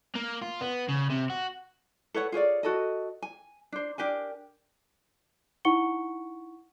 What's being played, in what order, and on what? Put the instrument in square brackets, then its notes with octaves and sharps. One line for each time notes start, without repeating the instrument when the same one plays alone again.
[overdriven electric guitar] A#3
F4
B3
C#3
C3
F#4
[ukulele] A4 B4 C#5 F#5
F4 G#4 C#5 D5
F#4 A4 D#5
G#5
D4 C5
D4 G4 A#4 G#5
[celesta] D#4 E4 F#5 C#6 C#7 G7